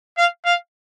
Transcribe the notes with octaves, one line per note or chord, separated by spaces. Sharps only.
F5
F5